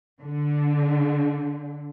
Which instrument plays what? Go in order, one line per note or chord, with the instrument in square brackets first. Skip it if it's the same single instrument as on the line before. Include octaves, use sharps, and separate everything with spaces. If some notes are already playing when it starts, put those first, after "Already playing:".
[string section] D3